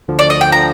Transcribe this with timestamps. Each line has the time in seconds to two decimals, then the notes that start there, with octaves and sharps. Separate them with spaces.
0.08 D2 D3 F3
0.19 D5
0.30 D#5
0.41 G5
0.52 D3 F3 A#5